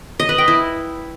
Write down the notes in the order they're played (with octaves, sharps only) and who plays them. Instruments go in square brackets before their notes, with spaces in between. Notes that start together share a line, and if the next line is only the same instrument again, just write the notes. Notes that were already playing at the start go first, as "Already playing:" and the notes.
[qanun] D#5
B4
G5
E4